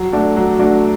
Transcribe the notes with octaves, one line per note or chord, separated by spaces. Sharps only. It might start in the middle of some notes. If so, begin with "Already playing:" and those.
Already playing: F#3
A3 D4 F#4
F#3
A3 D4 F#4